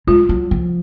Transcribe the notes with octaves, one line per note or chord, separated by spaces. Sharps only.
G#3 F4
F#3
F3